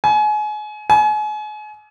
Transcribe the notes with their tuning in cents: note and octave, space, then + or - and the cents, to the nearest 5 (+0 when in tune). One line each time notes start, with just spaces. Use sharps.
G#5 +30
G#5 +35